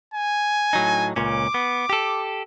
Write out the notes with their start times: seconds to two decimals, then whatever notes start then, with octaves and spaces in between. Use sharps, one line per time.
0.14 G#5
0.73 A2 F#3 D#4
1.16 C#2 A#2 C#4 D6
1.54 B3
1.90 G4 A4